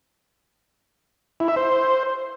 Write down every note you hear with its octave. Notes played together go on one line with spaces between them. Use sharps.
E4
E5
C5